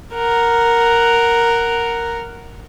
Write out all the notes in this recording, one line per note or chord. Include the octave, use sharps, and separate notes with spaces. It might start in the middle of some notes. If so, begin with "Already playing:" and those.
A#4 F#5